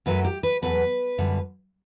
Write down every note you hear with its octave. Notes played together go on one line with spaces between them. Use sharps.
F#2 F#3 A3 B4
G4
B4
E2 B2 F#3 A3 B4
F#2 D3 G3